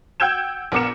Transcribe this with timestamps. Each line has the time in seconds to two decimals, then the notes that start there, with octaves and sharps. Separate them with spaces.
0.20 F#5 G5 E6 G6 G#6 E7
0.72 A#1 B3 A#4 D6 C#7 E7